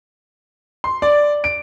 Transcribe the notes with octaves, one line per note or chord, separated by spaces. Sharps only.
C6
D5
D7